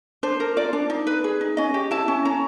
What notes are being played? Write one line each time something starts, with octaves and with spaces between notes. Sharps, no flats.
D4 C5
A#4
F4 D5
D4
D#4
B4
G#4
D#4
C#4 D#5
G4
E4 A5
C#4
C#4 A#5